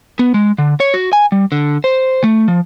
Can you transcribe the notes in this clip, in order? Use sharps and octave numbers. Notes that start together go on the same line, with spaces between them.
B3
G#3
D3
C#5
F#4
G#5
G3
D3
C5
A3
F3